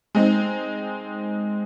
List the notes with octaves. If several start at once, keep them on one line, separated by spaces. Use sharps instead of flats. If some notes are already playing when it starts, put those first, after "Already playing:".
G#3 C4 D#4